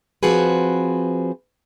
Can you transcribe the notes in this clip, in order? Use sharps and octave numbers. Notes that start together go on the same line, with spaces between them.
F3 C4 F#4 G#4 B4